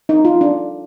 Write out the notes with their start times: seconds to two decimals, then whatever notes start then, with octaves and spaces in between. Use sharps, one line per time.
0.09 D#4
0.25 F4
0.41 D4